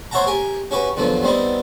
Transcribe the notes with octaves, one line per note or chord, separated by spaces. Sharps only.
C5 C#5 E5 F#5 A5 A#5
G4 A#4 G#5
C#4 F#4 G4 B4
E2 D3 F3 F#3 B3
G3 B3 C4 D#4 E4